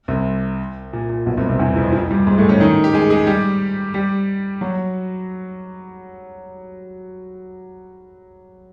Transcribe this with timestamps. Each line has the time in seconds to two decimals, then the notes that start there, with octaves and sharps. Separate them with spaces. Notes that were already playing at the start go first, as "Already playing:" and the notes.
0.08 C2 C3
0.93 A#2
1.09 A#2
1.26 B1 B2
1.37 C2 C3
1.49 C2 C3
1.59 E2 E3
1.76 F2 F3
1.93 F2 F3
2.11 G2 G3
2.27 G#2 G#3
2.38 A2 A3
2.49 C#3 C#4
2.60 D#3 D#4
2.84 G4
2.93 G#3 G#4
3.10 G#3 G#4
3.27 G3 G4
3.94 G3 G4
4.61 F#3 F#4